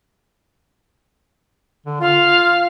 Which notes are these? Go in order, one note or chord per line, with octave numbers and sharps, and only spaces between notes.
D3
F4 F5